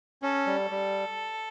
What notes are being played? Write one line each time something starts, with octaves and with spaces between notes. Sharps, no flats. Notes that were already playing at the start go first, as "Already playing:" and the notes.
C#4 A4
G3
G3